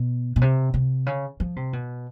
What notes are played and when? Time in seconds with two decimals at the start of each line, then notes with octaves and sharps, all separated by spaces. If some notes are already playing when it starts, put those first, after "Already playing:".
Already playing: B2
0.36 B2
0.41 C3
0.74 C3
1.06 C#3
1.40 F3
1.56 C3
1.73 B2